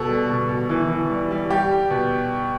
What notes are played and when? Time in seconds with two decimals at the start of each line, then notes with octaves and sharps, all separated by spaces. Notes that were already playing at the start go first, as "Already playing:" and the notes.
Already playing: B2 A4
0.09 G3
0.30 B2
0.49 B2
0.69 E3
0.90 E3
1.10 G3
1.31 G3
1.50 G3 G4
1.71 G3
1.90 B2